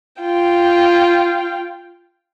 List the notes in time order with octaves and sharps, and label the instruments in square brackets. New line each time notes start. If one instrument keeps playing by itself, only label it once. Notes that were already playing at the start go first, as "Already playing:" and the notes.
[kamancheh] F4 G5